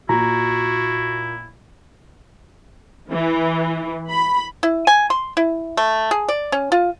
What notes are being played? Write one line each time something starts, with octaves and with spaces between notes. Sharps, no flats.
A#2 E4 F#4 A#5
E3
B5
E4
G#5
C6
E4
A3
G#4
D5
C#4
F4